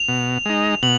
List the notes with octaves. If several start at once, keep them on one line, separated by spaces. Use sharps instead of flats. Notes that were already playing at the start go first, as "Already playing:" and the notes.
Already playing: F7
B2
G#3 D#4
B2 F#7